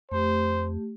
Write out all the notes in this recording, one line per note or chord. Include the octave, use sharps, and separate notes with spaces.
F2 A3 G4 C5